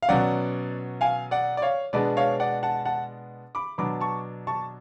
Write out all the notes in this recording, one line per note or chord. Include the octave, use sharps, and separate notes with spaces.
F5
B2 F#3 C#4 D5 F#5
F5 G#5
D5 F#5
D5
C#5 F5
B2 G#3 B3 D4 B4 D5
C#5 F5
D5 F#5
F#5 A5
F#5 A5
B5 D6
B2 F#3 B3 D4 B5 D6
A5 C#6
A5 C#6